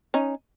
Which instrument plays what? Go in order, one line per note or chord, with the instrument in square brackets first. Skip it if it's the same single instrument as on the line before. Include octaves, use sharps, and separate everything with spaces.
[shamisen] C#4 D#4